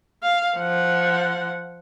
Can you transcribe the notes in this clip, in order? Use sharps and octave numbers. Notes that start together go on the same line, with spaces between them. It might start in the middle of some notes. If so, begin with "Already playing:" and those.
F5
F3 F#5